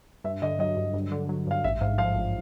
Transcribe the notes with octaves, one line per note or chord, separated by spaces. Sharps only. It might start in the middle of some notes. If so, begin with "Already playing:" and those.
G2 E5
D3 D#5
F#3 D#5
G2
G2
D3
F#3
G2 F5
A1 E5
G#2 F5
F3 F5
A1